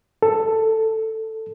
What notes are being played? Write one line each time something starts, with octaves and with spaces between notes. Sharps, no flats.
A4